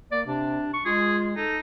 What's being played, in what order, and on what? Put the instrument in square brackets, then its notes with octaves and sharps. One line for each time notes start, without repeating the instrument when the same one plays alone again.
[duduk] A#3 [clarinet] D5
[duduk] C3 [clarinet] D4
[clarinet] C#6
[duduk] G#3 [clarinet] F4 [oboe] G#4
[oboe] D#4 [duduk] A4